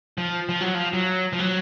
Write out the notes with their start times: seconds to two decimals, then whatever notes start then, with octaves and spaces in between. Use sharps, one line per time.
0.18 F3
0.49 F3
0.61 F#3
0.74 F3
0.93 F#3
1.33 F3
1.39 F#3